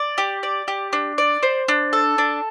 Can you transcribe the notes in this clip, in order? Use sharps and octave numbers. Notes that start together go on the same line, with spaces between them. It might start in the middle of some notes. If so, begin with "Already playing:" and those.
Already playing: D5
G4
D5
G4
D4
D5
C5
D4
A4
D4